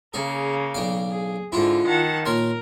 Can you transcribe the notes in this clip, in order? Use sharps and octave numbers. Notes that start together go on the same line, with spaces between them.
C#3 A#3 G#4
B1 D4 F5
G#4
G#2 D3 E4 F4
D#3 F#5 A5
A#2 A#4 C#5 C6